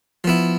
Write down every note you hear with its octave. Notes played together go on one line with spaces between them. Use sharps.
F3 B3 E4